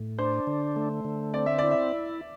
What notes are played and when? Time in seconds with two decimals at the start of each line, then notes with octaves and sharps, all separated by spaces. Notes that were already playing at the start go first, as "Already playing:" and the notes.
Already playing: A2
0.18 D4 C5
0.47 D3
0.76 A3
1.05 D3
1.34 C4 D5
1.46 E5
1.58 E4 D5
1.71 E5